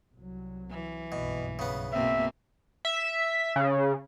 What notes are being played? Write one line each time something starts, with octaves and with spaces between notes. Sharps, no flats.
C2 F#3
E3
F#1 B1 G2 B2
C#3 B3
B2 A#3 C4 E5
E5
C#3